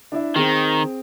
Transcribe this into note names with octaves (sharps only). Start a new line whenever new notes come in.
D4 E4 E5
D#3 C4 G#4